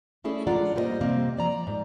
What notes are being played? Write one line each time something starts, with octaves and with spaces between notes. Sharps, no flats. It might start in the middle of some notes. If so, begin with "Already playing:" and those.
A3 C#4 E4 G#4 A4 D5
G#3 D4 F4 D5 F#5 A#5
G#2 G3 A#3 B4 C5 D#5
C3 G3 A#3 C4
F3 D5 A#5
G#2